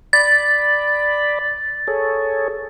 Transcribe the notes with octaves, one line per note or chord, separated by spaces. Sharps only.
D5 B5 A6
G#4 A4 C#5